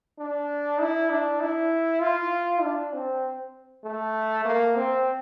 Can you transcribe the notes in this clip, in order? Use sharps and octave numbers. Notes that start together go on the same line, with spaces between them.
D4
E4
D4
E4
F4
D4
C4
A3
A#3
C4